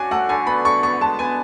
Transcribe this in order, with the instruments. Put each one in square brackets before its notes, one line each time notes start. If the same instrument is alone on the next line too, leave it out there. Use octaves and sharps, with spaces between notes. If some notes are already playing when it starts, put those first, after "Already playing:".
Already playing: [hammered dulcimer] C#4 D4 F#4 [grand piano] G#5
[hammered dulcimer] A3 [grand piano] F#5
[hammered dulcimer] D3 [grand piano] G#5
[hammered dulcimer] B3 [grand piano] B5
[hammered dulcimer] D3 [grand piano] C#6
[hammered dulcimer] B3 [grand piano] C#6
[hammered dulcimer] G#3 [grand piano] A5
[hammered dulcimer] B3 [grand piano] G#5